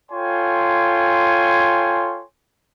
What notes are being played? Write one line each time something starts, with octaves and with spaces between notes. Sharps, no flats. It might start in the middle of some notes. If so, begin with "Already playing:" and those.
F4 A4 C#5 G5 G#5 C6